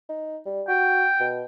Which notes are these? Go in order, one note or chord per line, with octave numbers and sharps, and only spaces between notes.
D#4
G3
F#4 G5
B2